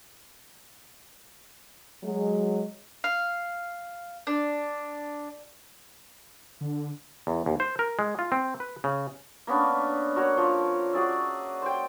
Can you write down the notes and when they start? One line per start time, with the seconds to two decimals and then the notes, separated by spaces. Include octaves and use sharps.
2.03 F#3 G#3
3.04 F5
4.27 D4
6.61 D3
7.27 E2
7.46 D#2
7.60 C5
7.79 A#4
7.99 G#3
8.19 F4
8.32 C4
8.60 B4
8.84 C#3
9.47 A#3 B3 C#4 D4
10.16 F#4 A#4 C#5
10.37 F3
10.93 F#4 G#4 D5 E5
11.62 C5 G5